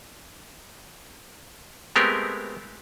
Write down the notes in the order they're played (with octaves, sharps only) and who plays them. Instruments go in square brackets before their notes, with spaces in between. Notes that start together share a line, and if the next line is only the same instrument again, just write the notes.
[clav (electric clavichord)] G#3 A3 B3 C4 G4 A#4